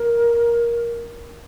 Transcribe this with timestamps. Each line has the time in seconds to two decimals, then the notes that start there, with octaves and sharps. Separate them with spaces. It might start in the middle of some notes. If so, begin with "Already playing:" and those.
Already playing: A#4